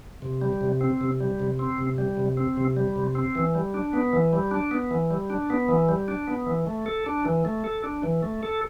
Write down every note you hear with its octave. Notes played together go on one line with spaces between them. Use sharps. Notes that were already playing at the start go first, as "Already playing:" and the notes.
C3
G3
C3
C4
C3
G3
C3
C4
C3
G3
C3
C4
C3
G3
C3
C4
E3
G3
D4
B3
E3
G3
D4
B3
E3
G3
D4
B3
E3
G3
D4
B3
E3
A3
A4
D4
E3
A3
A4
D4
E3
A3
A4